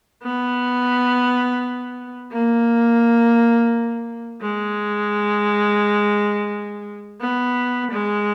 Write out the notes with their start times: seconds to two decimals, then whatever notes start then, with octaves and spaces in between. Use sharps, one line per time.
0.23 B3
2.32 A#3
4.41 G#3
7.21 B3
7.91 G#3